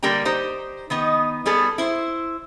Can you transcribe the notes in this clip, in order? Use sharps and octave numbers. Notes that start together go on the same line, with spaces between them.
D3 G3 A#3 G4 G5 A#5
D#4 G4 C5
D#3 B3 D#4
G3 B3 G#4 A4
E4 C5